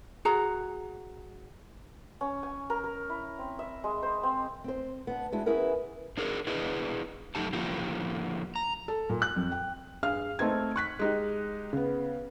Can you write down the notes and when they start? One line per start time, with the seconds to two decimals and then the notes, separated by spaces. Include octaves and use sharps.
0.25 F#4 G#4 A#5
2.21 C#4
2.43 G#5
2.70 A#4
2.84 A#4
3.09 E4
3.39 C4
3.59 E5
3.84 G#3
4.02 C5
4.23 C4
4.64 C4 C5
5.07 B3 D4
5.32 G#3 D4 E4 F#4 G#4
5.46 B3 C#4 E4 G#4 A#4 B4
6.17 D4 D#4 G#4 A#4
6.47 D4 E4 G#4 B4 D#5
7.35 F#2 G3 A3 D#4 G4 A5
7.53 D3 F3 A#3 E4 F4 G4
8.56 A#5
8.88 A4
9.10 A#2
9.22 F#6
9.36 F2
9.52 G5
10.03 G2 G#4 F5 F6
10.39 A3 C4 D#4 G#6
10.76 C#6 F#6 B6
10.99 G#3 D#4 G4
11.73 C#3 B3